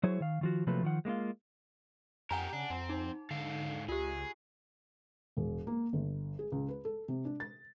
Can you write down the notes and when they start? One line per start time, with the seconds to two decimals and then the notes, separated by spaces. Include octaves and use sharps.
0.03 F#3 E4 G#4 C5 C#5
0.20 D#3 F5
0.41 D#3 F3 F#4
0.67 C3 F3 F#3 A3 A#3 B4
0.83 D#3 F3 F#5
1.05 G#3 A#3 D#4 F4
2.31 F2 G4 A#4 F#5 G#5 A#5
2.53 C#3 D4
2.70 F2 C4
2.89 D#4
3.31 G#2 D3 A4 F5
3.88 C#2 F4 G4 G#4
5.37 E1
5.67 A#3
5.93 G1
6.39 G#4
6.52 C#2
6.69 B4
6.85 A4
7.08 C3
7.25 D4
7.40 A6